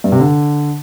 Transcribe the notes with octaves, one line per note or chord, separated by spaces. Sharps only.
G2
C3
D3